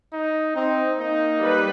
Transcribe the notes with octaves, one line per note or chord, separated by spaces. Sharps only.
D#4
C4 D#4
A#3 D#4
G3 B4